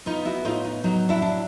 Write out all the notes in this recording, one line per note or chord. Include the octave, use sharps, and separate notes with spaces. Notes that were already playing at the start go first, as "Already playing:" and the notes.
B3 D#4 F4
E4 F#4
A2 D#4 F4
D#4
F#3 D#4
D4 E4
D4